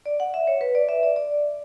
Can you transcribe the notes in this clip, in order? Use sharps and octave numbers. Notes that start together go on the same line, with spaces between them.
D5
F#5
E5
C#5
B4
D5
E5
D5
D5